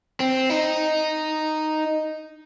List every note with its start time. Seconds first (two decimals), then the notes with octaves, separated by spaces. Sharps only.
0.20 C4
0.50 D#4